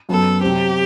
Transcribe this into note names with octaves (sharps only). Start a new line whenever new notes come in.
F#2 F#3 B3 A4
C3 F#3 C4 G4